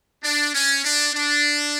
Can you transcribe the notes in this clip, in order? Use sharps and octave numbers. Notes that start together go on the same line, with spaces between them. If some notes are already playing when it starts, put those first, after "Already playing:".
D4
C#4
D4
D4